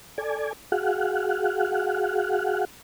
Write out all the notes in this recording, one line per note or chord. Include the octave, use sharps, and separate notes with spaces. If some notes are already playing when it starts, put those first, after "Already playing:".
A4 D5 G#5
F#4 G#4 F5 F#5